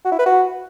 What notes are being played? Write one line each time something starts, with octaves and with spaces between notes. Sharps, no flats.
F#4
E4
B4
F#4